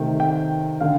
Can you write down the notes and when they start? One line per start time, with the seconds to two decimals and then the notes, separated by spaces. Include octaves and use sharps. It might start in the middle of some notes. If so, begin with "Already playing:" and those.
Already playing: C3 D#3 A3 G5
0.20 G5
0.80 D3 F5